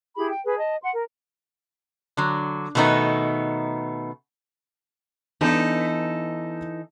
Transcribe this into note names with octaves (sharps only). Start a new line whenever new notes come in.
E4 G4 G#4 B5
G5
G#4 B4
D#5 A5
F#5 C6
A#4
D3 F#3
B2 D#3 A3 B3 D#4
E3 B3 D4 D#4 A4 D#5